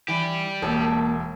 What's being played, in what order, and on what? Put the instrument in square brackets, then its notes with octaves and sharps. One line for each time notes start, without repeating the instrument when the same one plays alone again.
[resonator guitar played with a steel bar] E3 [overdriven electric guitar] G4 D5
[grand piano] E1 [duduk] A#3 [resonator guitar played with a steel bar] A4